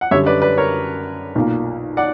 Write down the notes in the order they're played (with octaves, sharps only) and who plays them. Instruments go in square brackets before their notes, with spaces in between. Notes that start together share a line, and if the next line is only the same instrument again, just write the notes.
[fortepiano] F#5
[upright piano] F#2 D3 G3 C#4 [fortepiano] C#5 E5
[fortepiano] B4 D5
B4 D5
A#4 C#5
[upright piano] B1 A#2 A#3
[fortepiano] D5 F#5